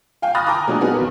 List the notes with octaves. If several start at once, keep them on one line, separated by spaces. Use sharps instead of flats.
F5 G5 G#5
B5 D#6 F6 F#6 A6 A#6
G5 G#5 A#5 D6 D#6
A#2 F#3 G#3 D4
B3 D#4 F#4 G#4 A#4 B4
B1 E2